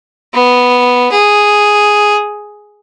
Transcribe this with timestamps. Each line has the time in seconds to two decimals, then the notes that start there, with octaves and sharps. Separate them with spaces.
0.34 B3
1.11 G#4